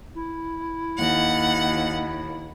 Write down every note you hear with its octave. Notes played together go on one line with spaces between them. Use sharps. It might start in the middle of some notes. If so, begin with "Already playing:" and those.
E4
D#2 F#5